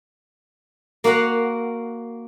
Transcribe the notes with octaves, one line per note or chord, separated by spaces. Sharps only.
A#3 F#4 F5 F#5